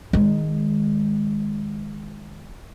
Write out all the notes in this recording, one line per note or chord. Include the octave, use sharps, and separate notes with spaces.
D#3 G#3